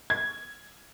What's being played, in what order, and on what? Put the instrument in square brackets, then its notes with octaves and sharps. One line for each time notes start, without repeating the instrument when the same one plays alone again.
[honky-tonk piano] G#6